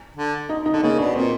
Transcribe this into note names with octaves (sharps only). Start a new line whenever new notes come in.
D3
D#4
D#4
D3
C#3 A#3
B2 D4
A#2 C4